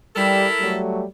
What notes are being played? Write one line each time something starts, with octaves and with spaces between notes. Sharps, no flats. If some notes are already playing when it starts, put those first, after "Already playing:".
G3 E4 A4 A#4
F#3 G3 A3